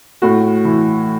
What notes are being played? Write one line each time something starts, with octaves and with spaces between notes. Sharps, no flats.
A2 F#4
E3